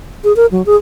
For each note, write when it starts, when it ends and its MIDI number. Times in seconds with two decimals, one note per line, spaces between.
0.24 0.35 68
0.36 0.46 70
0.51 0.64 54
0.66 0.76 68